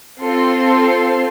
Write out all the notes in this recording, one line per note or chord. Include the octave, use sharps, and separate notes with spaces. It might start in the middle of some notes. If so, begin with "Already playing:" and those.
C4 F4 A4 C6